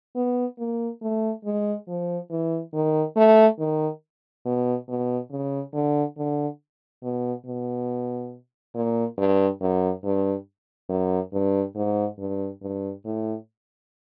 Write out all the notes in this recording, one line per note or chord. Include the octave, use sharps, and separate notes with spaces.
B3
A#3
A3
G#3
F3
E3
D#3
A3
D#3
B2
B2
C#3
D3
D3
B2
B2
A#2
G2
F#2
G2
F#2
G2
G#2
G2
G2
A2